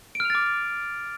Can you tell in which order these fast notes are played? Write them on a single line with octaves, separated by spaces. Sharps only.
D7 F6 F7 A6 D6